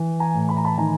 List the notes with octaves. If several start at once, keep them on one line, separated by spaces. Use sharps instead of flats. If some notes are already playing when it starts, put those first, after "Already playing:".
Already playing: E3
G#5 A#5
A2
B5
A#5
A5 B5
D#3 G#5 A#5